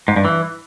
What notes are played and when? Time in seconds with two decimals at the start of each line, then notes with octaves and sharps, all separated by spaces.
0.08 G#2
0.16 G2
0.25 E3